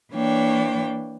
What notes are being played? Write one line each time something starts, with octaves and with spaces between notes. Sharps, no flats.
E3 A#3 D4 C#5 G5